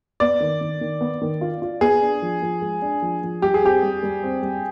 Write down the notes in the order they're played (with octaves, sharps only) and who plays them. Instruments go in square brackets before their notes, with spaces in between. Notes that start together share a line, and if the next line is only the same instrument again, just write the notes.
[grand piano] B3 [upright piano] D5
[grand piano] D#3
D#3
D#3
B3
D#3
F4
F4
[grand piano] B3 [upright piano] G#4
[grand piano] D4
F3
F3
G#3
D4
F3
F3
[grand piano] G3 [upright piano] G4
[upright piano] G#4
[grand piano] C4 [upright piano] G4
[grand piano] G3
G3
C4
G3